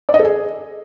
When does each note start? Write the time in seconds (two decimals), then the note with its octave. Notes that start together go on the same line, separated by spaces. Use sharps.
0.09 D5
0.14 D#5
0.19 A4
0.24 G#4